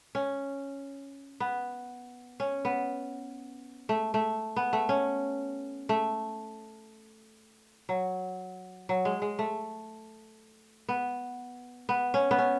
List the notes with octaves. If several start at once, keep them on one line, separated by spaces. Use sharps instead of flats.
C#4
B3
C#4
B3
A3
A3
B3
A3
C#4
A3
F#3
F#3
G#3
G#3
A3
B3
B3
C#4
B3
C#4